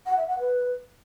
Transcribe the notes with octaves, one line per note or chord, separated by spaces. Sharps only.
F#5
E5
F#5
B4